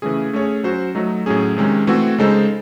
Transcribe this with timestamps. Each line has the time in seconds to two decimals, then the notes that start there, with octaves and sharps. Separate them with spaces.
0.02 C#3 E3 A3 C#4 G#4
0.33 A3 C#4 G#4 C#5
0.64 F#3 C#4 F#4 C5
0.95 F#3 A3 D#4
1.26 A2 F#3 C#4 G#4
1.57 C3 D#3 G#3 C#4
1.87 E3 A3 C4 F#4
2.18 C#3 G#3 D#4 A4 C5